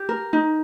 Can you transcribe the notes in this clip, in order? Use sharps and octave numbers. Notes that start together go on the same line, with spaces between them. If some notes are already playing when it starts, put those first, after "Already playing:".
Already playing: G4
A#4
D#4